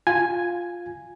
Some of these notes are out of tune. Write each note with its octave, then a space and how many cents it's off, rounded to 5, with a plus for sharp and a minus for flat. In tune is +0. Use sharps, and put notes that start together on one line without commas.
F4 +0 G#5 +0